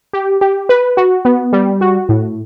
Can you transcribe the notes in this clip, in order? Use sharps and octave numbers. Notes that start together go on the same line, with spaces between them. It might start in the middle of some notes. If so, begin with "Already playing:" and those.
G4
G4
B4
F#4
B3
G3
F#4
A2